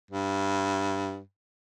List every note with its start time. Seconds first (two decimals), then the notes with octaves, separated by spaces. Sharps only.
0.11 G2